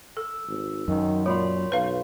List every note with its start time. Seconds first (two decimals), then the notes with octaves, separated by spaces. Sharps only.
0.17 A4 E6
0.48 G#1
0.88 F#2 D#3
1.26 A#2 G#3 C#5 B5 C6
1.72 B1 B4 F5